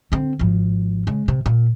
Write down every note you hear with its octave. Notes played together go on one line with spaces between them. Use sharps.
D3 C4
G#1 F3
C#3 G#3
C3
A#2